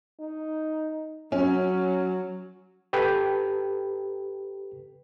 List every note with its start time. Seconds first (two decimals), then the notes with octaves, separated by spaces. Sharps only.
0.19 D#4
1.32 F#3 C#4
2.93 G4 A4 B4 G5